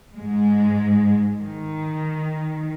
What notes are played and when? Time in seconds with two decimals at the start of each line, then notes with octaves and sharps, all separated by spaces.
0.17 G#2 G#3
1.41 D#3